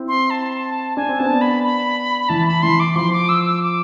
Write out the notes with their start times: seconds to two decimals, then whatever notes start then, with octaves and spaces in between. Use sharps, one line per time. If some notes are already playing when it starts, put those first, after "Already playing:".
Already playing: C4 E4
0.08 C6
0.30 A5
0.97 D4 G#5
1.09 C4
1.19 B3 D4 A5
1.41 B5
1.64 B5
2.29 E3 A5
2.46 B5
2.63 E3 C6
2.80 D6
2.95 F3 C6
3.13 D6
3.29 E6
3.46 E6
3.62 D6